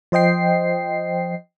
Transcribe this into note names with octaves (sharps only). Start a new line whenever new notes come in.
F3 C5 D#5 G5 C7